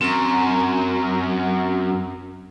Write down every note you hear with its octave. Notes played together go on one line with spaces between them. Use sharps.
F#2 C4 C#6